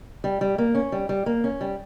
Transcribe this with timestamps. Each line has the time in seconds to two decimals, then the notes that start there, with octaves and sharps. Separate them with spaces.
0.24 G3
0.41 G3
0.58 A#3
0.75 C#4
0.92 G3
1.09 G3
1.26 A#3
1.44 C#4
1.61 G3